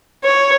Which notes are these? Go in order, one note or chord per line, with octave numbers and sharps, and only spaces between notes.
C#5